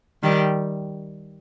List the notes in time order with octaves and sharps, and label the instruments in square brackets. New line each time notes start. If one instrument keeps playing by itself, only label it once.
[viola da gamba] D#3 G3